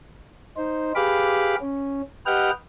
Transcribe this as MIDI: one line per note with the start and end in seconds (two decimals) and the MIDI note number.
0.57 0.93 63
0.57 0.93 72
0.95 1.56 67
0.95 1.56 68
0.95 1.56 71
0.95 1.56 77
0.95 1.56 83
0.95 1.56 86
1.61 2.02 61
2.26 2.51 67
2.26 2.51 71
2.26 2.51 75
2.26 2.51 78
2.26 2.51 79
2.26 2.51 89